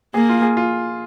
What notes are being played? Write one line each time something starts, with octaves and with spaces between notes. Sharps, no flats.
A#3 G#4
F4
G#4
F4